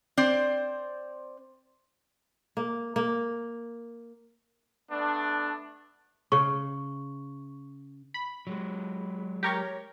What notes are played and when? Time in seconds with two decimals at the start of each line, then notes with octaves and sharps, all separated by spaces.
0.17 C4 C5 D5
2.57 A#3
2.96 A#3
4.91 A3 B3 D4
6.32 C#3 C#6
8.14 B5
8.47 F#3 G#3
9.43 G4 A#4 C#5